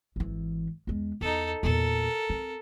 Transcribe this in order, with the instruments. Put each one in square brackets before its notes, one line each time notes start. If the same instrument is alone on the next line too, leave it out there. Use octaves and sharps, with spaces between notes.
[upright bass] G#1 E3
E2 G#3
[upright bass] E2 [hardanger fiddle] D#4 A4
[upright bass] E2 A#2 [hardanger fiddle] A4 A#4
[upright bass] C4